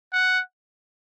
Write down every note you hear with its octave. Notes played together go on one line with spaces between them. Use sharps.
F#5